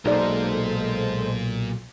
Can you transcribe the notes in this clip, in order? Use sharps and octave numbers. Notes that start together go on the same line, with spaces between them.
B1 A#2 G#3 D#4 A4 A#4 C5 D5